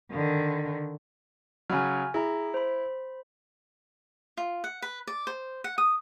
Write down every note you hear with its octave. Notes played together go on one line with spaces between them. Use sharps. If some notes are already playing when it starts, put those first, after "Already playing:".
D3 D#3
C#3 F#3 G#5 B5 F6
E4 G#4 A#5
C5 B5
F4
F#5
B4
D5
C5
F#5
D#6